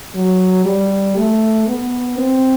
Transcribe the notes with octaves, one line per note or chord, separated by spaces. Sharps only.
F#3
G3
A3
B3
C4